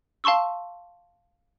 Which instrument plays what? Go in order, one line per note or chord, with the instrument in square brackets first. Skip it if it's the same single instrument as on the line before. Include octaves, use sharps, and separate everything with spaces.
[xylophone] F5 A5 C6 C#6 E6